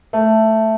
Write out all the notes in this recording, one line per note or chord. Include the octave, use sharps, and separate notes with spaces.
A3